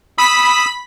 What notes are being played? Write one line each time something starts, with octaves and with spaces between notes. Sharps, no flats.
B5 D#6 E6 B6